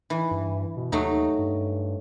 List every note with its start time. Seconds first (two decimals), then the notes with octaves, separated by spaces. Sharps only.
0.10 E3
0.31 G2
0.77 B2
0.92 D#2 F#3 A3 D#4
1.39 G2